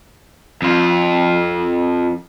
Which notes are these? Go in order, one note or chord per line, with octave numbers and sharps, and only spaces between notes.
F2 F4